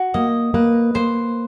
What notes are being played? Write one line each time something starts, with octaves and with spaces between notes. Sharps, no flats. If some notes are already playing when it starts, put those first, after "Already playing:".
Already playing: F#4
A#3 D#5
A#3 B4
A#3 C5